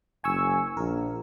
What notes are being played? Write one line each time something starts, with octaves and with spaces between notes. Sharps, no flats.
F#1 G#5 C#6 E6
A#1 A#4